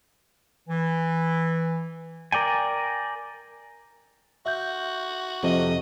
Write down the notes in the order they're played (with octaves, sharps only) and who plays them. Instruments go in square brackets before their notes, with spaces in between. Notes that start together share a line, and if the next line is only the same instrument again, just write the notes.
[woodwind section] E3
[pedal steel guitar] A#4 D5 G5 G#5
[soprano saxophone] F#4 [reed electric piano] E5 G6
[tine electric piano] F2 C3 [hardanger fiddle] D#5